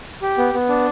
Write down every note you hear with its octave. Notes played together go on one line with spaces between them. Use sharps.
G4
B3
B3
D4